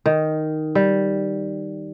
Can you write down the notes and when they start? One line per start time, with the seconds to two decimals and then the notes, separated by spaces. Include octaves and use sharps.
0.06 D#3
0.75 G3